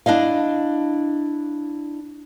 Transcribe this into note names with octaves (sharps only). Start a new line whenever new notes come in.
D4 E4 D#5 F5